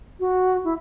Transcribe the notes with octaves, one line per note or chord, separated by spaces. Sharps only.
F#4
E4